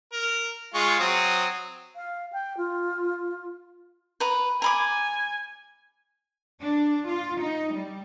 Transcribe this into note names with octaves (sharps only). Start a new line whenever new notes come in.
A#4
G#3 F4 C#6
F#3 C4 D#6
F5
G5
F4
B4 A#5
G#5 A#5 B5 D6
D4
F4
D#4
G3